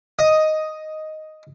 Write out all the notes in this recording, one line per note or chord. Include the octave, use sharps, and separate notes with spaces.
D#5